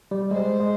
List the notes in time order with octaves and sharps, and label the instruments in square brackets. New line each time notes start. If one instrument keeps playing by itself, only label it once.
[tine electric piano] G3
[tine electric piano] G#3 [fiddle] C5
[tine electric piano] G#3